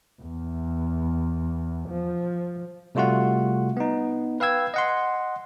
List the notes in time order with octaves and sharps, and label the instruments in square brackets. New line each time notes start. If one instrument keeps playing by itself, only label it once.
[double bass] E2
F3
[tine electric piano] C3 G3 A3 F4 F#4 F#5
B3 D#4
B4 F5 G5 E6 G#6
D#5 F#5 C6